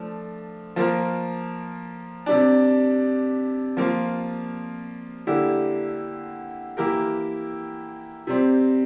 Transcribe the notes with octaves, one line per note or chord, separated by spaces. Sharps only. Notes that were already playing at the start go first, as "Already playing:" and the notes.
Already playing: F3 A3 D4
F3 A#3 F4 A#4
C3 G3 D4
F3 A#3 F4
D3 G3 A#3 E4 G4
E3 A#3 E4 G4 A#4
C3 G3 C4